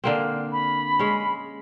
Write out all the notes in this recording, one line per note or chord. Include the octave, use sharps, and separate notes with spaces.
D3 A#3 C4
B5
G#3 C#4